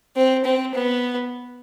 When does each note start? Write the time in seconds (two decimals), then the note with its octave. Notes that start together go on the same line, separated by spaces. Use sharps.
0.16 C4
0.44 C4
0.75 B3